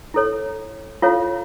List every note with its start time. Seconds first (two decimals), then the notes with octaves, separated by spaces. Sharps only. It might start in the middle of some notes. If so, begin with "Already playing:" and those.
0.14 E4 A4 C#5
1.02 E4 F4 A4 C#5 F5